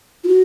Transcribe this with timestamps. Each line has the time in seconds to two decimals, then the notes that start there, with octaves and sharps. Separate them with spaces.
0.24 F4
0.28 F#4